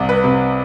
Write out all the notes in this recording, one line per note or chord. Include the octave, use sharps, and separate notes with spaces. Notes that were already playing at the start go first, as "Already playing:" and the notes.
Already playing: C2 C3
B4
C3